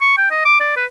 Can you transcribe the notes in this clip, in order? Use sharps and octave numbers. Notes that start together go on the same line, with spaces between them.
C#6
G5
D#5
D6
D5
B4